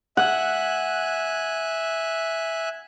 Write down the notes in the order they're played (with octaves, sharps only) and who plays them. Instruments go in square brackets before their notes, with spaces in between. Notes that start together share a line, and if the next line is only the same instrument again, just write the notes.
[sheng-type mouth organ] E5 G#5 F#6 [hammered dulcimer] F#5